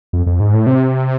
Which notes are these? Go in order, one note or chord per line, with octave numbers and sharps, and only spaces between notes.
F2
F2
G#2
A2
C3